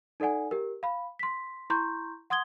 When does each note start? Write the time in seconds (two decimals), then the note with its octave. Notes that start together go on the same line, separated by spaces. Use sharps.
0.20 D#4 A4 D5 F#5 G#5
0.51 G4 A#4
0.83 F5 B5
1.19 C6 B6
1.70 E4 A#5 C6 C#6 G6
2.30 F#5 C6 D#6 G#6 G7